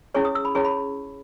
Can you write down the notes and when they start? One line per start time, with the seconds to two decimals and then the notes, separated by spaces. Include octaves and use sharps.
0.15 C#4 E4 G#4 C#5 C#6
0.25 D#6
0.35 E6
0.45 B5
0.55 C#4 E4 G#4 C#5 C#6
0.65 B5